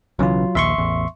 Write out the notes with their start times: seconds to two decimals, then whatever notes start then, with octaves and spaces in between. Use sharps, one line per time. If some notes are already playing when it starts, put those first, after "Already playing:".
0.19 B1 C#3 E3 F#3 F4
0.55 A#1 D#2 E5 C6 C#6
0.78 A1 E2